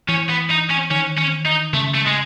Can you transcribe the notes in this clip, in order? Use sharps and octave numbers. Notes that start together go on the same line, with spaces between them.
E3 C#4
B3
D#4
C#4
D#3 C#4
C#4
D#4
C#3 A3
A3
G#3